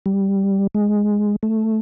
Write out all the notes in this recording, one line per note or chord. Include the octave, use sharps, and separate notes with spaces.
G3
G#3
A3